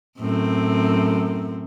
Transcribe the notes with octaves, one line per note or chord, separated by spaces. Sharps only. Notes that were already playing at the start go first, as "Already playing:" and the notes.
F#2 A2 C4